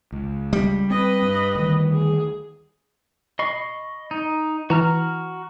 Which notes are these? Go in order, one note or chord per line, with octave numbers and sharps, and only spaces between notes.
C#2
G3
C4 B4 D#5
G2
D2 D#3
G#4
D#5 B5 C#6 C7
D#4
E3 F#4 A#5 F6